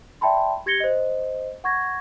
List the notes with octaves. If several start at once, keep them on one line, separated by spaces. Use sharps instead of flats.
D5 E5 G5 A5 B5 C6
G4 G#6 A#6 C#7 G7
C5 D#5
F#5 C#6 G#6 A#6